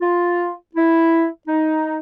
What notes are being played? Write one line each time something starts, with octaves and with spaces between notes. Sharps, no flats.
F4
E4
D#4